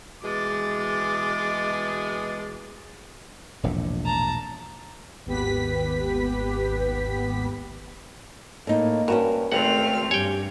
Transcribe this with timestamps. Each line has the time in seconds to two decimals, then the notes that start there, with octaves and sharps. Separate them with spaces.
0.24 B2 E3 G#3 D6 A6
3.63 E1 A#1 A2
4.05 A5 A#5
5.26 G#1 D#2 B3 G4 B4 B6
8.67 A2 A#3 D#4
9.08 G2 C#4 F#4 A#4
9.52 G#1 C#2 A3 C4 F#5 G5 F6
10.11 G2 G4 C#5 G5 G#5